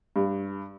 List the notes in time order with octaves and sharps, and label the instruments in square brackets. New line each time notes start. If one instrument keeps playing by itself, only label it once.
[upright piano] G2